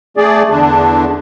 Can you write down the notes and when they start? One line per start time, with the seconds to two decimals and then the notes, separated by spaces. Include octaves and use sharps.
0.17 A3 G#4 D5
0.50 E2 D3 D4